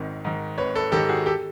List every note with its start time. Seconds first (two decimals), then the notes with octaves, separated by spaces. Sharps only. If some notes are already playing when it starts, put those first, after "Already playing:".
Already playing: G#1 G#2 D#3
0.25 G#2 D#3
0.58 G#1 B4 C#5
0.75 A4 B4
0.92 G#2 D#3 G4 A4
1.09 F#4 G#4
1.26 G4 A4